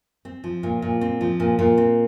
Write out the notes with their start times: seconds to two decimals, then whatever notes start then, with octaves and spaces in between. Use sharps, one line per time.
0.25 C4
0.44 F3
0.63 A#2
0.82 A#2
1.01 C4
1.21 F3
1.40 A#2
1.59 A#2
1.78 C4